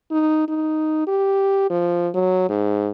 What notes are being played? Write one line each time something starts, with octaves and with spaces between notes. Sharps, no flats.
D#4
D#4
G4
F3
F#3
G#2